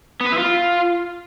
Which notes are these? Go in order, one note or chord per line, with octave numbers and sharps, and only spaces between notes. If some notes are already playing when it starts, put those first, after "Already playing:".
B3
B4
E4
F4